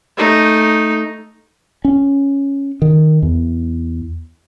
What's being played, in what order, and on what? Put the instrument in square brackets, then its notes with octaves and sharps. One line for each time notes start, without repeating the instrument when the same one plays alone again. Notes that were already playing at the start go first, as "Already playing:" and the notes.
[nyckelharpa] A3 D#4
[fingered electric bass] C#4
D#3
E2